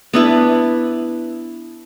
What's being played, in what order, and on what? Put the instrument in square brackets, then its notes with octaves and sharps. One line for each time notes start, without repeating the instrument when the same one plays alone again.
[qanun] B3 D4 E4 B4